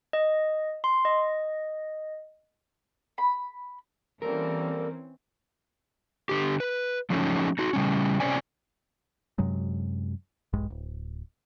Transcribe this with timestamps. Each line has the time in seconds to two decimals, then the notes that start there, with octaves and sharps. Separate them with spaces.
0.13 D#5
0.84 C6
1.05 D#5
3.18 B5
4.22 E3 G3 A#3 C4 C#4 A4 A#4
6.29 D3 G4
6.60 B4
7.10 F3 F#3 G#3 A3 C#4 D#4
7.59 D#4 F#4
7.73 C#3 G3 C#4
8.20 C3 F#3 C#4 C5 D5 G#5
9.38 F#2 C3 F#3 G#3
10.53 D#1 A#1 G2 G#3
10.70 D1